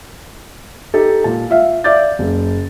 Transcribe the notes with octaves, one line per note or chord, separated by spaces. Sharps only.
D#4 G4 A4
A#2 A5
F4 E5 F5
D5 E5 F5 D6 G6 A6
F#1